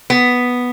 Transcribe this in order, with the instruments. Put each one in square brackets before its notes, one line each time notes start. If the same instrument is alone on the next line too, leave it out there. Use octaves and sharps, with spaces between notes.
[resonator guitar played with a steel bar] B3